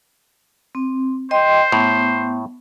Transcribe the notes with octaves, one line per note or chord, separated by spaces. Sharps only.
C4
C5 D#5 G5 C6
A2 B3